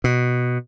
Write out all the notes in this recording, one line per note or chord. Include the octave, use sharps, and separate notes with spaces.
B2